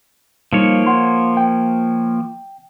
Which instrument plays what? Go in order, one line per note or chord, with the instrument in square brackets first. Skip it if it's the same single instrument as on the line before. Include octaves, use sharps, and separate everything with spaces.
[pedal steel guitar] F3 A#3 C#5 [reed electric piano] G3 D#4
[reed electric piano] F#5 C6
G5